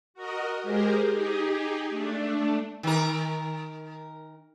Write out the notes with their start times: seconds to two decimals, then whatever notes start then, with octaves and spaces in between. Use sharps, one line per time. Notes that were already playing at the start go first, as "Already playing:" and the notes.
0.14 F#4 A#4 D#5
0.63 G#3 G4 G#4 A#4 C5
1.10 D#4 G4 G#4
1.89 A3 D4
2.83 D#3 A#4